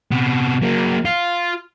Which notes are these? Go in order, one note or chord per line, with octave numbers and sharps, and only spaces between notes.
C3 B3
F#3 A#3
F4